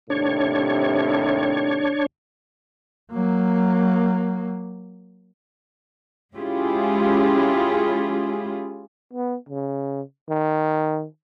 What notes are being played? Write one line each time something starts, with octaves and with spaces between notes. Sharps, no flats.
D#2 A2 C3 D4 C#5
F#3 A#3
G#3 C#4 E4 F4 G4 G#4
B3
C#3
D#3